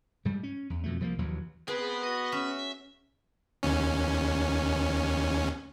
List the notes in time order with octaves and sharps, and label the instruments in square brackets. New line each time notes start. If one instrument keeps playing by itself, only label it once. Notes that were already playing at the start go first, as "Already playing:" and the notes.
[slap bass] G#2 G3
C#4
E2
F2 B2 A3
C2 F3 F#3 A#3
A#1 D#2 E3 F#3
[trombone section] B3 [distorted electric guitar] C4 [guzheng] G#4 [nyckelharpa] B4
[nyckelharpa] F#4 [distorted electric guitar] D#5
[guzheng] C#4 [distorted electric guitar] E5
[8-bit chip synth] D#2 C#4